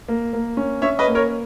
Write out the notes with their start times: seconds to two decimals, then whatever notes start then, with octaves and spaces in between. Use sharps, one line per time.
0.08 A#3
0.33 A#3
0.57 C#4
0.82 C#4 C#5 E5
0.99 B4 D#5
1.08 A#3
1.15 A#4 C#5